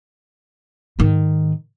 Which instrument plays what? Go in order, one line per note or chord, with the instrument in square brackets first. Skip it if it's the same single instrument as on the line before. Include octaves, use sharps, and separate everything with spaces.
[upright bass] G#2 D#3